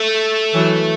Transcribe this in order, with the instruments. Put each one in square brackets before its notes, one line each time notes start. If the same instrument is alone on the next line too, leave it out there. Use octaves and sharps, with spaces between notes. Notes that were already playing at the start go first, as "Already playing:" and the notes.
Already playing: [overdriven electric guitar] A3
[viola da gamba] E3 F#3